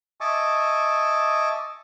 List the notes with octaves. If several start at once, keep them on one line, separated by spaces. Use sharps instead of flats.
D#5 E5 G#5 A5 C#6 D6